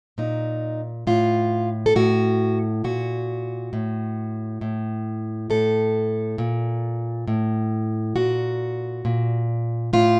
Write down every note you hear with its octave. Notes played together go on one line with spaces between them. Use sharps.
A#2 D#4
A2 F4
A4
A2 F#4
A#2 F#4
A2
A2
A2 A4
A#2
A2
A#2 F#4
A#2
A2 F4